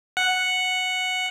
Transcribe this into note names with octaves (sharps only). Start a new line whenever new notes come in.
F#5